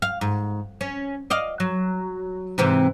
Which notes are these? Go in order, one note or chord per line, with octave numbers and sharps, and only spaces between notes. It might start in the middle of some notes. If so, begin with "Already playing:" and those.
F5
G#2
C#4
D5 D#5 F5
F#3
G#2 C3 E3